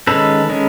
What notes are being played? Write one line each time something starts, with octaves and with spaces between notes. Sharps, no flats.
D#3 G#3 C#4 A4 B4
D#3 G#3 C#4